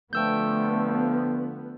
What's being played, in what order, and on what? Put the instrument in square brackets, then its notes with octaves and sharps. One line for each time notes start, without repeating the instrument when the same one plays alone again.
[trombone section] D3 F3 [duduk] A3 [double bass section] B3 [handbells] G5 E6 G6